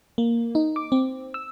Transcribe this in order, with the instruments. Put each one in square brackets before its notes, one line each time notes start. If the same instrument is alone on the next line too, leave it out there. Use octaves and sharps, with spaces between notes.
[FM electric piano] A#3
D#4
D6
C4
E6